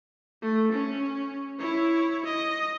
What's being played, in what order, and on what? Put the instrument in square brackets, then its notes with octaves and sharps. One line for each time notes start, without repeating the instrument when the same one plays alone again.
[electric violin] A3
C#4
E4 C#5
D#5